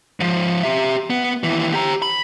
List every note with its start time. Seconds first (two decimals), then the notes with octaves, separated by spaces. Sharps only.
0.20 G#2 F3
0.63 G4 E5
1.10 B3
1.43 D#2 E3
1.74 G4 A#5
2.02 B5